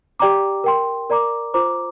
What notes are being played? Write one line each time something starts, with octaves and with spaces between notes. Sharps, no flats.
G4 D5 G5 A#5 D6
A#4 G5 C6
A#4 D5 A#5 D6
F4 C5 A#5 D6